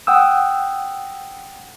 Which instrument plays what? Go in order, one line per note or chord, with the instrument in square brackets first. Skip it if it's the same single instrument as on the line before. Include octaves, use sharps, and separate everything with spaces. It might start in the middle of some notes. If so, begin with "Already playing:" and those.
[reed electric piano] F#5 G5 D#6 E6